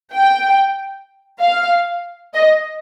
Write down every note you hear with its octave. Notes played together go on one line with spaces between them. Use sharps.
G5
F5
D#5